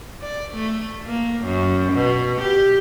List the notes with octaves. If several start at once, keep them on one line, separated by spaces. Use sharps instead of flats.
D5
A3
A#3
F#2
B2
G4